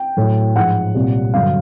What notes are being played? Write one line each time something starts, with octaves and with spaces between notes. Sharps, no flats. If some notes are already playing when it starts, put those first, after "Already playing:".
Already playing: G5
A2 F#3
G#2 F3 G#3 F#5
C2 A#2 G3
G2 D3 F#3 F5